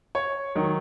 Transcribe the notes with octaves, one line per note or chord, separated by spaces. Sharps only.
C#5
D#3 F#3